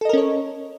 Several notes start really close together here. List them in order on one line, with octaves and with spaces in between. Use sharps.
A4 D#5 A#4 C#4 C#5